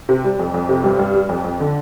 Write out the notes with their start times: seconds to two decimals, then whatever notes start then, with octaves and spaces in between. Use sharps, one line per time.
0.09 C3
0.24 G3
0.39 F2
0.54 F2
0.69 C3
0.84 G2
0.99 G2
1.14 G3
1.29 F2
1.44 F2
1.60 D3